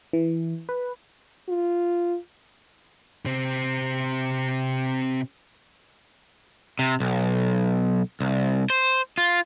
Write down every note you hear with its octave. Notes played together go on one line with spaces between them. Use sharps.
E3
B4
F4
C3 C4
C3
B1
C2
C5
F4